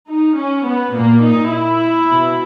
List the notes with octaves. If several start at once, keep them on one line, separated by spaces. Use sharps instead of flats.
D#4
C#4
B3
A#2 A#3
D#4
E4
B2